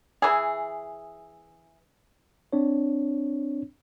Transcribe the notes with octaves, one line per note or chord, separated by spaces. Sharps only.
E3 G#4
C4 D4 C#5